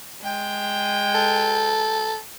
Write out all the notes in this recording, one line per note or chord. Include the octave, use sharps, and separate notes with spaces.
G#3 G5
A4